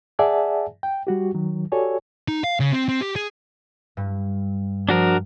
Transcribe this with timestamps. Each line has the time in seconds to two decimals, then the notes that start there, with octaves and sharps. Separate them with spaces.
0.19 G#4 D5 E5 F#5 G#5 A5
0.83 G5
1.07 G3 F#4 G4
1.34 D#3 F#3
1.72 F#4 G4 A4 C#5 D5 G#5
2.28 D#4
2.44 F5
2.60 C#3
2.72 C4
2.89 C4
3.01 G4
3.16 G#4
3.97 G2
4.89 F3 D4 F#4 A#4